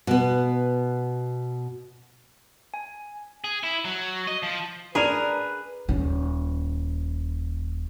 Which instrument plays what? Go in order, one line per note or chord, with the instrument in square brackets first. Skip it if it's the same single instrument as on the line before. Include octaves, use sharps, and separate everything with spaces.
[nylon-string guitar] B2 B3
[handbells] G#5
[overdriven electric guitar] G#4
E4
F#3
D#5
F3
[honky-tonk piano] D4 D#7 [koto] G#4 [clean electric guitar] A#4 [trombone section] B4
[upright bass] D#1 C#4